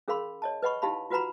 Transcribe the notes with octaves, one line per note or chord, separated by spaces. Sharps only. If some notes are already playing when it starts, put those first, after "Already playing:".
C#4 G#4 A#4 F5 B5 C6
C#5 D#5 A5
B4 D#5 F#5 B5 C#6
D#4 E4 G4 F5 A5 B5
F4 F#4 B4 F#5 A#5 B5